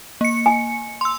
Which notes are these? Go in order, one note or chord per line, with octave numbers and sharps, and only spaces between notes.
A#3 C#7
G#5
C6 E6